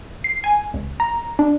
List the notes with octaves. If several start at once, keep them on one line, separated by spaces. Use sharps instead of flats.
C7
G#5
C#2
A#5
D4